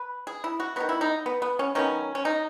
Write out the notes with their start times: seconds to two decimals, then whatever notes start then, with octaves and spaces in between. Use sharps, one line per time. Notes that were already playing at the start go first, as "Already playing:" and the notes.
Already playing: B4
0.27 G#4
0.44 E4
0.60 F#4
0.76 D#3 F#3 B3 F#4
0.89 E4
1.01 D#4
1.26 B3
1.42 B3
1.59 C#4
1.75 D#3 F#3 B3 C#4
2.15 C#4
2.25 D#4